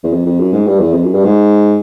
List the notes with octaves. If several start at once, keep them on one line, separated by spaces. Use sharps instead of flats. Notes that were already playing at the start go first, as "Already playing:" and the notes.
E2
F2
F2
F#2
G#2
G2
E2
F2
F#2
G2
G#2